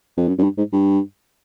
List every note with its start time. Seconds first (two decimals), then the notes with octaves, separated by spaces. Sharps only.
0.17 F2
0.28 F#2
0.38 F#2
0.43 G2
0.58 G#2
0.73 G2